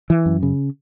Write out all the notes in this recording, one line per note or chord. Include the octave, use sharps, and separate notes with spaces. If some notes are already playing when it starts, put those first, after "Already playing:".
E3
F#2
C#3